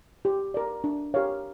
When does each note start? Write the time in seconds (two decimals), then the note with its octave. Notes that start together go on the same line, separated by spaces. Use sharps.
0.25 G4
0.54 A#4 D5
0.84 D4
1.14 G4 A#4 C#5 F5